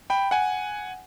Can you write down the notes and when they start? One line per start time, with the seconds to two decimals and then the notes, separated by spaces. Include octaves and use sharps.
0.10 G5 B5
0.31 F#5 G#5